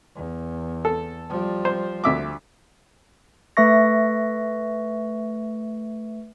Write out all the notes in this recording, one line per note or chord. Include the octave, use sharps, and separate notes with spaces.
E2
A4
F3 G3
C5
D2 E5 D6
A3 B4 E5 C#6 A#6